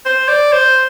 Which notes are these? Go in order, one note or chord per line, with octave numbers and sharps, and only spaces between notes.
C5
D5
C5